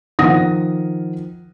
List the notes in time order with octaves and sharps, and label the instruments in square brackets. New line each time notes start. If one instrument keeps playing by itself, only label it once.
[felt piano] D#3 F3 F#5 D#6 A#6